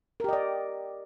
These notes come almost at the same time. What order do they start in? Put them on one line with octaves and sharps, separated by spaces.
A#4 G4 D#5 D5